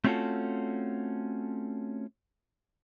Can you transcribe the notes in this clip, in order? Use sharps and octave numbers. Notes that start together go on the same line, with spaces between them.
A3 C4 C#4 F4 F#4 A4